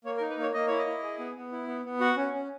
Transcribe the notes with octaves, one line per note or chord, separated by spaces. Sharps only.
A#3 C#5
A#4
D#4
B4
A#3 C#5
A#3 D#5
E4 C#5
D#5
E4
G#4
B3
B3
E4
B3
B3
F#4 F#5
C#4
C#4